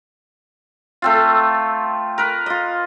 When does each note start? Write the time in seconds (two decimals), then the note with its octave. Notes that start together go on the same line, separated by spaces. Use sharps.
1.02 A3 C4 F4
2.18 A#4 B4
2.46 F4 D#5